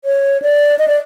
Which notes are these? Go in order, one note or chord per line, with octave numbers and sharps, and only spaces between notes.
C#5
D5
D#5
D5